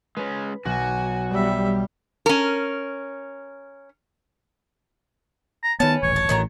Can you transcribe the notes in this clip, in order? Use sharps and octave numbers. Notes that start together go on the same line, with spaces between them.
G#3 C#4 B4
B1 F#4 G#5
G3 B3 E5
C#4 A#4
A#5
D#3 B3 C#4 B4 A5
D#1 A1 C#5
A5
A1 A2 D#3 F#3 A#5